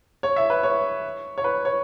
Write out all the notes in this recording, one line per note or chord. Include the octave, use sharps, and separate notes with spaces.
C#5
E5
B4
C#5
C#5
B4
C#5